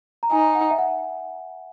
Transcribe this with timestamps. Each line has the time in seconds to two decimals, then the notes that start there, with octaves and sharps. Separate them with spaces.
0.23 A#5
0.31 D#4 G#5
0.55 F#5
0.71 E5
0.79 F#5